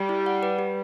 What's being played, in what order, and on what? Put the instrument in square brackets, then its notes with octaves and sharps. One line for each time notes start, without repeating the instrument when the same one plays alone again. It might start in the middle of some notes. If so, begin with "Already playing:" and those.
Already playing: [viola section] G3 [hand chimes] G4
[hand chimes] E4
F#5
B4
G4